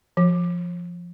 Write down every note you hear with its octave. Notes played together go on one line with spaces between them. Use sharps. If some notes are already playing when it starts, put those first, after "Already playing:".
F3